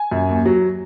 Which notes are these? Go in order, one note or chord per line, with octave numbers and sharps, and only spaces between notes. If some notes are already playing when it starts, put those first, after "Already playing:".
Already playing: G#5
F#2
D#2
F#3